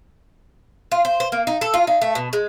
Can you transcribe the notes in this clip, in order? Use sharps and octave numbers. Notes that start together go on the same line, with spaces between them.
F4
C5
C5
A#3
D#4
A4
F4
D#4
A3
B2
G#3